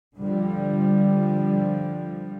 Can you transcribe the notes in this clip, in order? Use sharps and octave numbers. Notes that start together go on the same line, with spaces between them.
D3 F3 G3